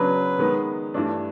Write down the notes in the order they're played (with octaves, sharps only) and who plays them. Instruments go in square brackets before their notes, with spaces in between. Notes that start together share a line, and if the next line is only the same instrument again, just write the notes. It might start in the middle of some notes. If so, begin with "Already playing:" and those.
Already playing: [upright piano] C#3 F#3 B3 D4 [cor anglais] B4
[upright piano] D#3 G#3 B3
G2 E3 A3 D4